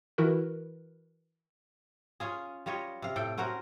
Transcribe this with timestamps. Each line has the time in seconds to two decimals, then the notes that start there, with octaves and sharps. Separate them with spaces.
0.18 E3 E4 F#4 A#4 B4
2.20 C#4 F4 G#4
2.66 G3 F4 C#5 D#5
3.02 C3 F5
3.16 A2 A4 G5
3.38 C#4 F#4 A#4 C5